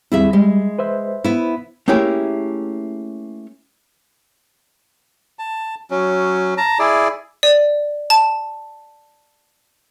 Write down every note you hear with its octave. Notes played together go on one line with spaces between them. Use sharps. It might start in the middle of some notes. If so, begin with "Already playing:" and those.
D#2 G3 C4 E4 G#4 E5
G3 G#3
B4 C5 E5
B3 E4
A3 A#3 C#4 E4 G4 G#4
A5
F#3 C#4
A5 A#5
E4 G#4 D5
D5
A5